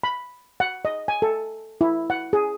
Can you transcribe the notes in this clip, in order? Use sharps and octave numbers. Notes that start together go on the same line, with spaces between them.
B5
F#5
D#5
G#5
A4
E4
F#5
G#4